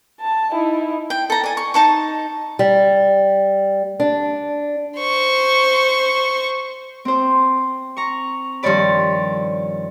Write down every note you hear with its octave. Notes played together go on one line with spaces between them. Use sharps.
A5
D#4 E4
G5
A4 A#5
D5 G#5
C#6
D#4 A5 C#6
G3
D4
C5 C#6
C4 C5
A#5 C#6
G2 D#3 F3 C#5 D5 B5